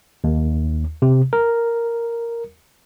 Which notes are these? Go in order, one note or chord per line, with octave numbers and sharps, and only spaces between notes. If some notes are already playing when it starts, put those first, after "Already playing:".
D#2
C3
A#4